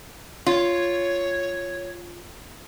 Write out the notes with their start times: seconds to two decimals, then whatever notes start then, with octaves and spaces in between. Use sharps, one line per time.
0.46 F4 C#5